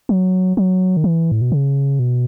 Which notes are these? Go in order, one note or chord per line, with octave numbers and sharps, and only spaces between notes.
F#3
F#3
D#3
E3
A2
B2
C#3
B2